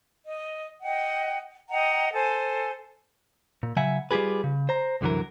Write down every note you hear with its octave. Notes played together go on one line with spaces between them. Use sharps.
D#5
D#5 F#5 G5
D#5 F#5 G5 A#5
A4 C5 G#5
A#2
C#3 F#3 E5 F#5 G#5
G3 F4 G4 G#4 B4
C#3
C5 A#5
C2 F#2 D3 E3 F#3 A#4